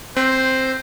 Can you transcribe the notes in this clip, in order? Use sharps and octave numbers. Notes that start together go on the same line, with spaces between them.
C4 C5